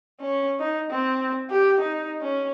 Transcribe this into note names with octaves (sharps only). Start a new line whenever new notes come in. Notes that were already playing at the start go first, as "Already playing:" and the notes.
C#4
D#4
C4
G4
D#4
C#4